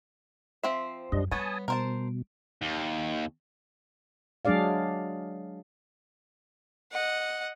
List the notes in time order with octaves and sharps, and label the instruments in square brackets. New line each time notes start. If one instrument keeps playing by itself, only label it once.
[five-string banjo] F3 C4 E5
[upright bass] F#2 [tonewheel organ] G3 D4 D#5
[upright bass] G3 [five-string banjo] B3 C#5 [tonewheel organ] G#5 A5 D#6
[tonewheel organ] B2 [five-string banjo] A#4 C5 A5
[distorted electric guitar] D#2
[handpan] F#3 G#3 D4 G#4 D5 F5
[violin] D#5 F#5